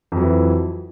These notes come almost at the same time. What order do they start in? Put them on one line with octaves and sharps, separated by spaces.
F2 F#3 E3